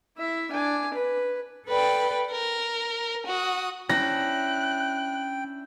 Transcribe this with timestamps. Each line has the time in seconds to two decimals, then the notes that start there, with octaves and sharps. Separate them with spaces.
0.17 E4 E5
0.51 D4 G#5
0.94 B4
1.67 A4 B4 D5 G5
2.29 A#4
3.26 F#4 D#6
3.89 C#4 D4 E4 G5 F#6 A#6